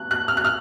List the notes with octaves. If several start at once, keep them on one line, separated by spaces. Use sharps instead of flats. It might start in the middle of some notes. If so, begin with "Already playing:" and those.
Already playing: F#6
F#6
F6
F#6
F6